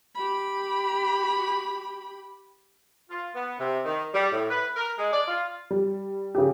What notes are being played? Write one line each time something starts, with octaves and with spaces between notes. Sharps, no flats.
G4 B5
F4
B3
C3
D#3
G3
A2
B4
A#4
G#3
D5
F4
G3
C#3 G4